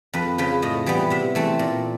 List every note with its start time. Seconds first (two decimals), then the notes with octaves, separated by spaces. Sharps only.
0.14 F2 B4
0.38 C#3 F3 B4
0.62 A2 D#5
0.86 E3 G3 B3
1.10 C3 E5
1.35 E3 A3 C4
1.59 A#2